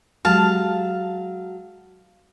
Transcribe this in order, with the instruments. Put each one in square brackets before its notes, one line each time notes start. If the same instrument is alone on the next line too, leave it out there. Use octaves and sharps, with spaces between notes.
[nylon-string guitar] F#3 G#3 G4 [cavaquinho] F5 A5